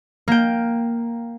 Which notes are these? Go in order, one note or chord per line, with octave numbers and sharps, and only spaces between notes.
A#3 G5